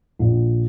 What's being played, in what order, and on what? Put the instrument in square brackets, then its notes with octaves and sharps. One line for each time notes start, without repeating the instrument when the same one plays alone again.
[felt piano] A#1